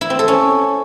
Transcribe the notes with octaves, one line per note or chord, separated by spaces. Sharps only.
E4
C4
A4
C#4